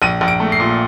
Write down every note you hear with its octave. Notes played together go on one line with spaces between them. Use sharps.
A#1 D#7
A#1
D7
A3
C7
A#2